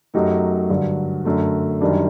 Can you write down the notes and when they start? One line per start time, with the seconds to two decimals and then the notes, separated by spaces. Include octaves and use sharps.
0.14 F#2 F#3 A3 D#4 G4
0.70 G2 D3 F#3
1.25 F#2 D3 A3
1.81 F#2 D#3 G3 D4